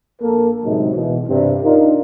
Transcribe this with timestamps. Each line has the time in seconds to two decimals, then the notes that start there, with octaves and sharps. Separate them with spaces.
0.22 A#1 A#3 A4 A#4
0.65 D2 A2 C3 F#3 G#3 D#4
0.96 B2 E3
1.28 G2 C3
1.63 D4 D#4 F4 A#4